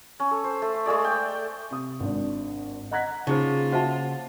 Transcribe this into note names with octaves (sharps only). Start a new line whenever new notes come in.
C#4
A4
C5
A3
G#3 A3 G#4 D5
G5
C3 D#6
G#1 D4
D#5 F#5 A#5 F#6 G#6 B6
C#3 A#3 D#4 F4 G#4 C5
F#4 C5 E5 F#5 A5